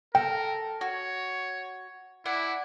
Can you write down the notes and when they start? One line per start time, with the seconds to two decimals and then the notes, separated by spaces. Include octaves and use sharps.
0.15 A4 A#4 G5
0.81 F#4 C#5
2.25 E4 D5 F#5 G#5